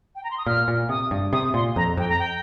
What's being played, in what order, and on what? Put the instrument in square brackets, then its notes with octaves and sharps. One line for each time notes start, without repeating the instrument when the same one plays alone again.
[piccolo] G5
A#5
C6
D#6
[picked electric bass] A#2 [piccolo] F6
[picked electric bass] A#2
[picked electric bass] C3 [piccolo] D#6
[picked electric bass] G2
[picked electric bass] C3 [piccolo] D#6
[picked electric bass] A#2 [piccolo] C6
[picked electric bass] F2 [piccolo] A#5
[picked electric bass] F2 [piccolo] G5
[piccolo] A#5
G5